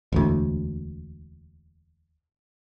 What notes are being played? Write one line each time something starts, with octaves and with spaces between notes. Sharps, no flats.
E1 D2